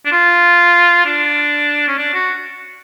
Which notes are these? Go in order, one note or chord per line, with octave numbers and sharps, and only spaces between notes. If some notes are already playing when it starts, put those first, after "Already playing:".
D4
F4
D4
C#4
D4
F#4